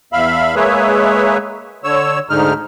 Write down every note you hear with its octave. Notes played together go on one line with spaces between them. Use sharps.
E2 E5 F5 B5
G#3 A#3 G#4 B4 C#5 E5
D3 C#5 E6
D2 G#2 D3 G#3 D#4 F6